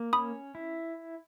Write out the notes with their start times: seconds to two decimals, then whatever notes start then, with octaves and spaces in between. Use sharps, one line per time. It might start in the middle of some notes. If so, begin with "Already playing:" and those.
Already playing: A#3
0.13 C#4 B5 D#6
0.55 E4